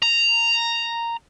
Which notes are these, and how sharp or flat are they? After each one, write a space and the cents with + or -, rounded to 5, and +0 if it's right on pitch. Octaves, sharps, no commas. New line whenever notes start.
A#5 -5